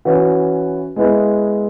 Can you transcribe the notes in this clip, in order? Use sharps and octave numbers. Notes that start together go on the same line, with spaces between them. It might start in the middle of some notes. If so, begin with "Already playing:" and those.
E3 C#4 F#4 B4
G#3 B3 E4 B4